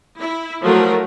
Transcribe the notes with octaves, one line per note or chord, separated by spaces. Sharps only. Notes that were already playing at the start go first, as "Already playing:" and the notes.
E4
F3 F#3 A3 A#4